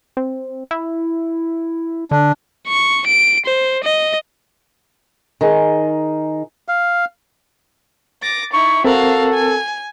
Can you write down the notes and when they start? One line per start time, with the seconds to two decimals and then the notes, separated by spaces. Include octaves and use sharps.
0.17 C4
0.71 E4
2.11 D3 D4
2.68 C#6
3.07 D7
3.46 C5
3.84 D#5
5.41 D#3 D#4 G#4
6.68 F5
8.22 D6 A6 A#6
8.53 D#4 E4 C#6
8.85 C4 F#4 A4 A#4 F5
9.34 G#5